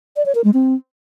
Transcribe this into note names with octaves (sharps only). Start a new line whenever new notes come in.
D5
C#5
A#4
G#3
C4